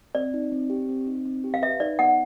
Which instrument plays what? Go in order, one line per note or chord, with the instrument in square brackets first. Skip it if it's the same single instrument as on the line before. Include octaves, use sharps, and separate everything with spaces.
[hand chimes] C4 [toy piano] D5
[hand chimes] D#4
C4
G4
C4
D#4
C4
G4
[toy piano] F5
[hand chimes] B4 [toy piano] E5
[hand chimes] D#4 [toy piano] D5
[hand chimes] B3 [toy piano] F#5